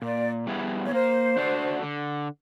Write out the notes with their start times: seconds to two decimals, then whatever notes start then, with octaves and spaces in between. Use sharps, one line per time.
0.02 A#2 D5
0.47 G3 B3 E4 G#4
0.84 C#5
0.92 A#3 C5
1.37 D4 F#4 A4 D5
1.82 D3